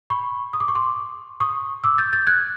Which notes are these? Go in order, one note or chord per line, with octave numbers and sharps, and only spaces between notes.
B5 C#6
D#6
D6
C#6
C6 D6
C#6 D#6
D6 E6
G6 A6
G6 A6
F#6 G#6